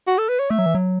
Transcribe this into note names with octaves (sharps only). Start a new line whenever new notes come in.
F#4
A4
B4
C#5
A3 E5
F#3
E3
F#3